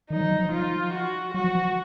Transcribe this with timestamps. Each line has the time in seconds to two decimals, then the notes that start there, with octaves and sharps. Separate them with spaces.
0.10 D#3 D#4
0.16 F#3
0.21 F3
0.31 F#3
0.41 F3
0.52 F3 F4
0.93 F#4
1.34 F#3 F#4
1.44 F3
1.55 F3